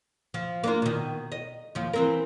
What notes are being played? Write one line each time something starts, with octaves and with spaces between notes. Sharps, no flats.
F3
A#3 D4 F4
B2 D#3
D#5
D#2 F3
E3 C4 A#4